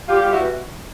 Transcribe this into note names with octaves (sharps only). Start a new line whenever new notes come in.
G3 F4 G4
G3 F4 G4
E4 F#4
B2